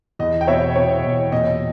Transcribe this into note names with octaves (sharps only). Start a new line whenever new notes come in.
E2 D#5
G5
B2 C#5 E5
B2 C#5
E2
A#2 D#5